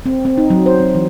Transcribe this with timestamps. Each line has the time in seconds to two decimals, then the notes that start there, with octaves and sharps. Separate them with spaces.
0.06 C4
0.25 C4
0.37 D#4
0.50 F#3
0.66 C5
0.80 C4
0.95 E3